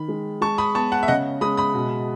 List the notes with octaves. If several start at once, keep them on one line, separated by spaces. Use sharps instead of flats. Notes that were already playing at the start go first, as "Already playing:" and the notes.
Already playing: D#3 B5
G#3
G#3 A5 C#6
B5 D#6
B3 A5 C#6
F#5 A5
E5
C#3 D#5 F#5
G#3 B5 D#6
B5 D#6
B2